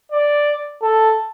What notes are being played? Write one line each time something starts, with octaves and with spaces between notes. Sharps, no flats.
D5
A4